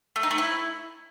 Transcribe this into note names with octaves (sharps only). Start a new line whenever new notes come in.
A3
D#4
A3
E4